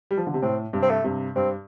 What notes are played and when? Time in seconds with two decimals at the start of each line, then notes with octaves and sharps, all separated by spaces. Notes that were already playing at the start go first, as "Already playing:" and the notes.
0.11 G3
0.17 F3
0.27 D3
0.34 C3
0.42 A2 C4
0.73 G2 C3
0.82 C4
0.89 A3
1.04 G2 C3
1.35 G2 C4